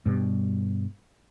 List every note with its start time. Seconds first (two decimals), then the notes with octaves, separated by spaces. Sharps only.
0.06 G2 B2 G3